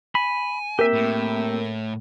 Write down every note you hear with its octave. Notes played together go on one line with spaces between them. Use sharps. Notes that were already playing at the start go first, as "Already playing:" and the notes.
G#5 B5
A#3 C4 G4 A#4 E5
A2